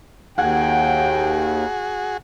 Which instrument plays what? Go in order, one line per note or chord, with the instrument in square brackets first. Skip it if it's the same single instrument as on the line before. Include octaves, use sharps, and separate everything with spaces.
[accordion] D#2 [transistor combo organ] F#4 G#4 [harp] F#5 F#6 G#6 [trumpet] G5